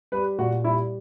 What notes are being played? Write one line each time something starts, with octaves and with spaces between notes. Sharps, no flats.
G3 B4
A#2 F#4
G3 E4